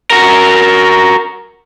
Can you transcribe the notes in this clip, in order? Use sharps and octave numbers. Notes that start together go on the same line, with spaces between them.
F#4 A#4